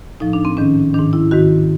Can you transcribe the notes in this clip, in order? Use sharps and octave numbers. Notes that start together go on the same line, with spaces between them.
A2 F3 D#4
D4
C4
G#2 D#3 C#4
G#2 D#3 D4
E4
G#2 D#3 F#4